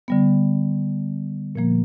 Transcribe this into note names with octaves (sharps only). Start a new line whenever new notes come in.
D3 G3 B3
A#2 F3 A#3